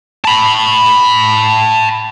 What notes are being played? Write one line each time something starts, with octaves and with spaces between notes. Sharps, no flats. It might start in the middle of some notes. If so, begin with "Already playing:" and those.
A5 B5